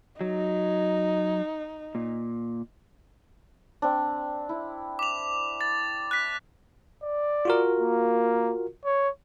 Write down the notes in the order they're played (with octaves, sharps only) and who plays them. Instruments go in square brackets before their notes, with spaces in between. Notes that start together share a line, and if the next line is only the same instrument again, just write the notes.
[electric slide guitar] F#3 [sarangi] D#4
[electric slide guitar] A#2
[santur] C4 D4
E4
[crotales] D6 F7
A6
F#6 B6
[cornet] D5
[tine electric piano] F4 F#4 A#4
[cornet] A#3
C#5